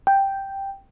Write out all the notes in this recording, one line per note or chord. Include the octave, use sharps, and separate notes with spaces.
G5